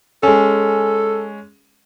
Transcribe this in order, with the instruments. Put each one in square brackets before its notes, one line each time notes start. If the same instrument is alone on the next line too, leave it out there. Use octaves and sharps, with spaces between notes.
[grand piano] G#3 C#4 [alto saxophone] A4